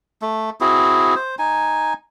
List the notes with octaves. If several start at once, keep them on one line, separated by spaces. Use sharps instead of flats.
A3
C4 E4 F#4 G#4
C5
D#4 G#5